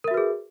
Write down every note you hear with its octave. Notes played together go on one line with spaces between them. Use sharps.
F#4 G#4 A#4 B4 E5